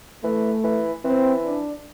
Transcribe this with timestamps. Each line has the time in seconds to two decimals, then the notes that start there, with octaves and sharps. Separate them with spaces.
0.24 E3 A3
0.64 E3
1.04 E3 C4
1.45 D4